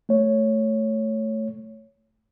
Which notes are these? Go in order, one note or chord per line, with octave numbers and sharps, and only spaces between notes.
A3 C#5